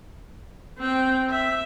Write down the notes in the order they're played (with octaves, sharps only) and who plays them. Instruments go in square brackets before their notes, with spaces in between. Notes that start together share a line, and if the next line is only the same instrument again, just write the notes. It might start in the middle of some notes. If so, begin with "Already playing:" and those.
[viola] C4 G5
E5